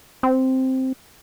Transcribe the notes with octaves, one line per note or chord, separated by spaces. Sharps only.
C4